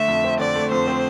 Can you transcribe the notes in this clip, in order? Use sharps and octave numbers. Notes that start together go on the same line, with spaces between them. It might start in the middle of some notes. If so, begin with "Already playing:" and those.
Already playing: D3 A3 E5
F2
C4
D3 D5
A3
F2 C5
C4